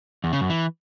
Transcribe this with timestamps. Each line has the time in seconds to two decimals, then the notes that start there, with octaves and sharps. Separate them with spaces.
0.24 E2
0.32 C#3
0.41 F#2
0.50 E3